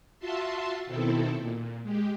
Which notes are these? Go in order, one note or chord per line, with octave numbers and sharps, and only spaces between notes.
F4 F#4 E5 A5 C6
B2 D#3 C4 E4 A4
A#2
G#3 G4